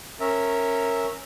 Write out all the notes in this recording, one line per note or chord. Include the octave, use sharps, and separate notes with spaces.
C#4 A#4 E5